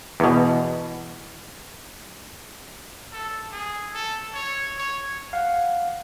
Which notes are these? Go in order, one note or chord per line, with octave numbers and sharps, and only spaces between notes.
E2 B2
A4
G#4
A4
C#5
C#5
F5 F#5